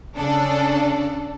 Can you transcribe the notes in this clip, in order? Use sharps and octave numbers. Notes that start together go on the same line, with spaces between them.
C#3 D4 A4